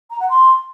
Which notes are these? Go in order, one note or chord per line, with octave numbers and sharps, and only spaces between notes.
A#5
F#5
C6